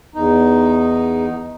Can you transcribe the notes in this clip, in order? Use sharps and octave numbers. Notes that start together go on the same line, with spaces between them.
E2 D#4